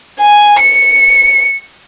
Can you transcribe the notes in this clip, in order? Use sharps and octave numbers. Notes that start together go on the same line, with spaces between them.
G#5
C#7